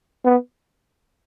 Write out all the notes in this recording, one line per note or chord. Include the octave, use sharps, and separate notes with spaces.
B3